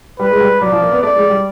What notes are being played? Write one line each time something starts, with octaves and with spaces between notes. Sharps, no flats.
G3 B4
G#3
G3
F#3 D5
F3
A#3
B3
A3 D5
G#3
G3